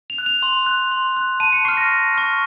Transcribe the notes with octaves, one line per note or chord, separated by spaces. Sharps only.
F7
F#6
F7
C6
F#6
C6
F#6
A5 D#7
C#7
C#6 F6 C7
A#6
A5
C#6 F6